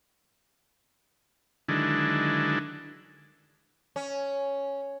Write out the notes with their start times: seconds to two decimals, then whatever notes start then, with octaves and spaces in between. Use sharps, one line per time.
1.69 D3 D#3 F#3 G#3 D4 E4
3.96 C#4